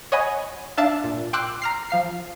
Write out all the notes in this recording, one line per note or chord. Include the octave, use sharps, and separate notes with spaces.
C#5 D#5 F#5 G#5 B5
D4 E5 F5 A5
A#2
G5 C6 D6 E6 F#6
A#5 F6 C7
F3 F5 C7